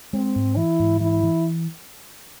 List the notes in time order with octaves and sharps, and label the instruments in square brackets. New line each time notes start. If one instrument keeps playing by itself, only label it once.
[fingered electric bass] G#3 [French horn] C4
[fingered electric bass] G#2
[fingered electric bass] E3 [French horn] E4
[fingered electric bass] G#2
[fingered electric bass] E3 [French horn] E4
[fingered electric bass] E3